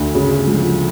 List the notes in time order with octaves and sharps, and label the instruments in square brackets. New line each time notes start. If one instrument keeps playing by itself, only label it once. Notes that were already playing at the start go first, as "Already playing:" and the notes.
Already playing: [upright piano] D2
C#3
F3